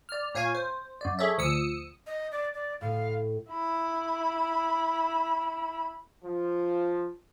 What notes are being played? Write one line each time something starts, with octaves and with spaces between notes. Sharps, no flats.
D5 F6
A#2 C#5 F5 G#5 G#6
C5
F#2 D5
G#4 A4 C#5 E5
D2 F3 D#6 E6 C#7
D#5
D5
D5
A2 F5
E4 B5
F3